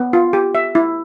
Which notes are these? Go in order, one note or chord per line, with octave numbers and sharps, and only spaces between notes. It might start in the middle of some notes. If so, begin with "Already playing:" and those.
Already playing: B3
F4
G4
E5
E4